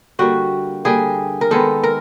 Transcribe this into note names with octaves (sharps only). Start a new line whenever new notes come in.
D3 G3 A#3 F#4
D3 G3 A#3 G#4
A#4
D#3 G#3 B3 A4
A#4